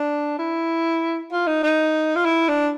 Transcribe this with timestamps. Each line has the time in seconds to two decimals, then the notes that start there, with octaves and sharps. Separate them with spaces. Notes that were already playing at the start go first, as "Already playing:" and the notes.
Already playing: D4
0.39 E4
1.32 F4
1.47 D#4
1.63 D#4
2.15 F4
2.25 E4
2.48 D4